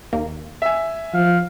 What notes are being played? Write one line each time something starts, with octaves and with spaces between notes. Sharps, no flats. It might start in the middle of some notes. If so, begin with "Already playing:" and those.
D#2 A#3
E5 G#5
F3 F5